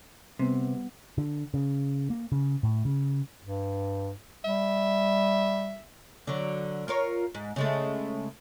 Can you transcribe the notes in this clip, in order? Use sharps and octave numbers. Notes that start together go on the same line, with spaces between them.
C3 G3 B3
D3
C#3
A#3
C#3
A2
C#3
G2
G3 E5
D3 F#3
F4 A#4 C#5
G#2
C#3 G#3 A3